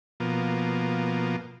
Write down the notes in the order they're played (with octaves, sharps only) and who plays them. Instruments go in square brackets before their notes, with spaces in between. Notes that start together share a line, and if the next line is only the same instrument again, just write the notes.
[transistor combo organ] B2 F3 A#3